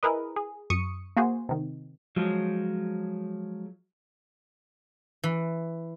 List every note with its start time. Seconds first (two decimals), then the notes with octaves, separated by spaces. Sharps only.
0.03 E4 G#4 A#4 B4 D#5
0.36 G#4
0.70 F#2 C#6 D#6 C#7
1.17 A#3 F#4 G#4 C5
1.49 C3 D#3
2.16 F3 F#3 G#3
5.24 E3